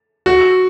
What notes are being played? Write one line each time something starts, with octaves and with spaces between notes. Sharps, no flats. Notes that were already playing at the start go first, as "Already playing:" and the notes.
F#4